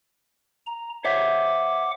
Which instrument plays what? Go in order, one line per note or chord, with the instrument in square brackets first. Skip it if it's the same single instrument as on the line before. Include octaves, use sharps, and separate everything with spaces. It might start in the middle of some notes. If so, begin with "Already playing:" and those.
[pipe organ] A#5
[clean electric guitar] C5 C#5 E5 [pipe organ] F#5 D6